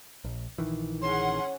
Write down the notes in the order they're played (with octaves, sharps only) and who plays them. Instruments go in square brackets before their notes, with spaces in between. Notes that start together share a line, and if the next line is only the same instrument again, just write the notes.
[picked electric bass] A#1
A#1 D#3 E3
[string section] C#4 G#4 F#5 [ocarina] C#5 [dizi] C6